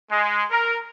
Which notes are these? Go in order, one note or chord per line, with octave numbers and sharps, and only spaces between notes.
G#3
A#4